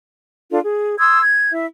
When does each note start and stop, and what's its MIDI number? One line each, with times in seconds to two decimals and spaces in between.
0.51 0.59 62
0.51 0.59 65
0.51 0.59 69
0.64 0.95 68
0.99 1.20 84
0.99 1.20 87
0.99 1.20 88
0.99 1.20 92
1.22 1.51 92
1.51 1.66 64
1.51 1.66 76